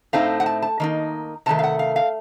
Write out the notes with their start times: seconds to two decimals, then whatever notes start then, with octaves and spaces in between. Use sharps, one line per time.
0.13 A2 A3 C4 D#4 F5
0.40 F#5
0.46 A5
0.62 A5
0.80 D#3 A#3 D#4
1.46 C3 D#3 A3 A5
1.59 F5
1.63 F#5
1.79 F5
1.96 F5